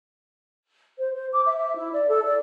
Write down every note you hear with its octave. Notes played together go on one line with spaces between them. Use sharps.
C5
C5
D6
E5
E5
E4
D5
A4
D5